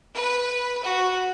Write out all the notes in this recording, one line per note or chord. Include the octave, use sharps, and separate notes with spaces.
B4
F#4